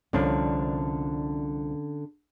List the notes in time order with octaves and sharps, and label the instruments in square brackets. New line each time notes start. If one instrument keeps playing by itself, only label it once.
[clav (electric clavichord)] C2 F3 D4 [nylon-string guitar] D3 C#4